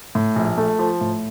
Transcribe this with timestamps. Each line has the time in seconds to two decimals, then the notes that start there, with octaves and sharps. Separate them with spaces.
0.15 A2
0.36 A#1
0.58 A3
0.79 F3
1.01 A2